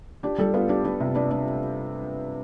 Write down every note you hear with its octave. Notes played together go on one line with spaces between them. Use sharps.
D4 G4
G3 A4
B3 F4
D4 G4
D4 B4
C3
D4 B4
D4